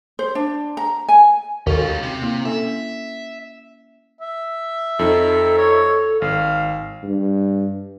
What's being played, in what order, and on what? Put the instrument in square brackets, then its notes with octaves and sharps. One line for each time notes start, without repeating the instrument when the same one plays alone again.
[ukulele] C5
D4
A#5
G#5
[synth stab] D#2 [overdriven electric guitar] C#4 F4 [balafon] F#4 A4
[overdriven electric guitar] C3
[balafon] A#3 E4
[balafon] C#4 A4 [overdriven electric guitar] E5
[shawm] E5
[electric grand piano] F2 D#4 [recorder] A4
[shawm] C#5
[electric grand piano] G#1 [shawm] F5
[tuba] G2